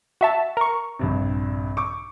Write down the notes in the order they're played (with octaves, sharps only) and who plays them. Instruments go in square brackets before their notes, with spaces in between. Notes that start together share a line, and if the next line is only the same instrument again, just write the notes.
[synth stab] F#4 E5 A5
A#4 C#6
[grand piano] A#1 G2 C3
C#6 D6